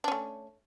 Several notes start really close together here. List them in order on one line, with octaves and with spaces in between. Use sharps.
D4 C#4 A3